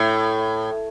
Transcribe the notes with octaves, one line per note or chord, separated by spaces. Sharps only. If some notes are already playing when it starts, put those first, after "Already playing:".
Already playing: A2